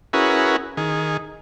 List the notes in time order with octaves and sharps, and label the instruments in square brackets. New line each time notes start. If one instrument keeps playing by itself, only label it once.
[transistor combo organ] C#4 E4 F#4 G#4 A#4 B4
D#3 G#4